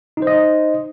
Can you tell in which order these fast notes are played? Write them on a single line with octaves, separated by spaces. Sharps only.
D#4 C5 D#5